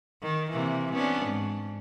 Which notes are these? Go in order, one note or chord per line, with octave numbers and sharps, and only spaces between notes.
D#3
C3 E3 A#3
B3 C#4 D4
G#2